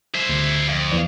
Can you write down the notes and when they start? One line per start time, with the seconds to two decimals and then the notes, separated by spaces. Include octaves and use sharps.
0.15 E4 C5
0.29 D2
0.68 F2
0.92 E2 E3 D5